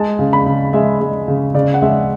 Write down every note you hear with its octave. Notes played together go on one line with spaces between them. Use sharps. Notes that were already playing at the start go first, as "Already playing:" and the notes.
Already playing: G#3 A5
C#3
B5
C#3
G#3 E5
G#3
C#3
C#3 D5
F#5
G#3 E5